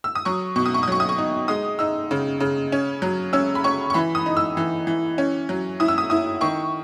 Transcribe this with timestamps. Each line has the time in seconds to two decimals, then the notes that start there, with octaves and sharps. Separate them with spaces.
0.04 E6
0.15 D#6
0.25 F#3 C#6
0.56 B2 C#6
0.66 D#6
0.74 C#6
0.83 D#6
0.88 F#3 C#6
1.00 D#6
1.09 C#6
1.18 D#4
1.48 G#3 D#6
1.79 D#4 E6
2.11 C#3
2.40 C#3
2.72 C#4
3.02 F#3
3.33 C#4 E6
3.55 B5
3.64 C#4 C#6
3.90 C#6
3.94 E3 B5
4.15 D#6
4.26 D#4
4.37 E6
4.57 E3
4.87 E3
5.18 C#4
5.49 F#3
5.80 E4 D#6
5.88 E6
5.98 D#6
6.10 E4 D#6
6.41 D#3 C#6